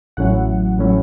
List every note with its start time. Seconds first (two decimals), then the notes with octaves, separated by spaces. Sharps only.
0.17 A1 A2 F#3 C#4 E4 F#5
0.77 A1 A2 F#3 C#4 E4